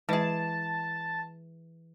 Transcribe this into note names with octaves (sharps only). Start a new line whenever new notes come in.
E3 G#3 G#4 B4 D#5 A5